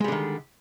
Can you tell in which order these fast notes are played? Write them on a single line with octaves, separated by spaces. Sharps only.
G#3 G3 D3 D#3